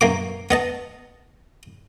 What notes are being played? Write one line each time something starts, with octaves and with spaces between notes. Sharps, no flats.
F#2 A#3 D6
B3 D#5 A5